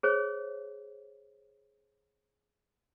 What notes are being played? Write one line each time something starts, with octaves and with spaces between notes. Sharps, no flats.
G#4 C5 C#5